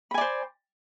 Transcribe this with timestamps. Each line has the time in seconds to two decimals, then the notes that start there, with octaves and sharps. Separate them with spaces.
0.11 B5
0.14 G#5
0.18 D5
0.21 C5